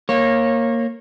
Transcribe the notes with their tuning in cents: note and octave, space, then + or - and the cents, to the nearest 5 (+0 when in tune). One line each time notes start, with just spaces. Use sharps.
A#3 -5 C#5 -25